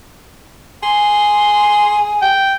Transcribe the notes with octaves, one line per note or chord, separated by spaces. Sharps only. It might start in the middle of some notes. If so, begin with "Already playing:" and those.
G#4 C6
G5